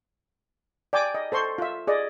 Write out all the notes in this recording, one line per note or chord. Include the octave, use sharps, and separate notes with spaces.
D5 G5 G#5 D6
D#5
A4 C5 C6 C#6
F4 E5
G#4 D5 D#5